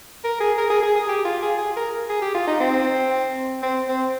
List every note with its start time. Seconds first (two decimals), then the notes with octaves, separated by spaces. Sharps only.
0.24 A#4
0.40 G#4
0.58 A#4
0.70 G#4
0.83 G#4
0.96 G#4
1.09 G4
1.25 F4
1.43 G#4
1.58 G#4
1.76 A#4
2.10 G#4
2.22 G4
2.35 F4
2.47 D#4
2.60 C4
3.63 C4
3.88 C4